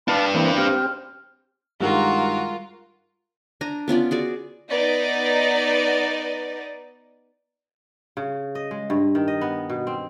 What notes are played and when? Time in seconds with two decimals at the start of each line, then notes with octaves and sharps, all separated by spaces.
0.08 D4 B4 F5 A5 B5
0.34 E3 A#3 C4
0.58 C4 G4 F6
1.81 G2 D#3 G3 G#3 F4 F#4 A#4 A#5
3.61 D4 G#5 A#5
3.88 B3 C#4 F4 D5
4.11 F#4 G#4 D5
4.70 B3 D#4 D5 D#5
8.17 C#3
8.55 D#5
8.71 G#3
8.90 G2
9.15 D#3
9.28 D#5
9.41 B3
9.70 B2
9.87 C4